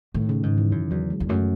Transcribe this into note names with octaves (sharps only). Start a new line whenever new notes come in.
A2 D#3
C#3
G#2 D#3
E3
F#2 E3
E2 F#3
G#3
E2
F#2 A3